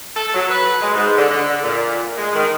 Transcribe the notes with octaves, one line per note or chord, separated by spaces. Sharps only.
A4
F#3
B4
G#3
G#2
D3
D3
A#2
G#3
D#3